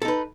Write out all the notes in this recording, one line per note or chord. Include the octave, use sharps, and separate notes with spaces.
D#4 A4 B4